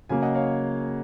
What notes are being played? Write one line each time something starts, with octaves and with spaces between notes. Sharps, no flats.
C#3 F#3 A#3 F5 G#5
D#5 F#5
C#5 F5